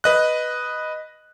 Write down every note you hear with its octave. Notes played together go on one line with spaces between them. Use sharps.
B4 D#5 F#6